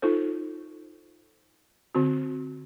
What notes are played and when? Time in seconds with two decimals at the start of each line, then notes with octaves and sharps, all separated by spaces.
0.02 D#4 F4 A4 C5
1.95 D3 C4 F#4